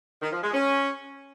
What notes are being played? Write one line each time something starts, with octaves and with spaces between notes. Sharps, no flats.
D#3
F3
G#3
C#4